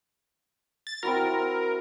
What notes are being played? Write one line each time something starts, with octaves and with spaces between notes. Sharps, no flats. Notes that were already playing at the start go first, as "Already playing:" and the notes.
A6
C4 E4 F#4 A#4
E4